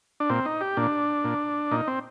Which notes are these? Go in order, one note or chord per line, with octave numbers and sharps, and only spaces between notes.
D4
A#2 C4
D#4
G4
A#2 D4
A#2
A#2 D#4
C4